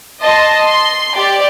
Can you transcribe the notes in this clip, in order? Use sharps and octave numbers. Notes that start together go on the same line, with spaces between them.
D#5 A5 C6
C6
G4 D5